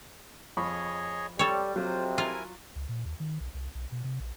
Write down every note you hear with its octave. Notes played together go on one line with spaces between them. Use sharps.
F2 G#4 C#5 D#5 B5 C#6
G3 C4 A4 C#5
F2 C3 F#3 F4 C5
E4 F4 A#4 G#5
C#2
A#2
D#2
D#3
B1
C2
B1
B2
C3
A#1